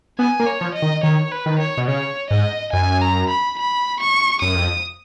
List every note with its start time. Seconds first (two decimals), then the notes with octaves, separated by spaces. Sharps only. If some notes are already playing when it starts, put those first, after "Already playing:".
0.19 B3 G#5
0.40 A#3
0.47 C#5
0.61 F3
0.75 D#5
0.82 D#3
1.03 D#3 C#5
1.32 B4
1.46 D#3
1.59 C#5
1.77 B2
1.88 C#3 C#5
2.30 G#2 D#5
2.73 F#2 G#5
3.02 A#5
3.29 B5
3.58 B5
4.00 C#6
4.42 F#2 D#6
4.55 F2